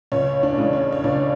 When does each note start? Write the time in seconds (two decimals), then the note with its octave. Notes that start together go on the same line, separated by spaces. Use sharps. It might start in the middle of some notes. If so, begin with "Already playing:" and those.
0.12 C#2 C#4 C#5
0.43 D4 D5
0.58 C#3 E3 G#3
0.73 C#4 C#5
0.92 C#5
1.04 C#2 D4 D5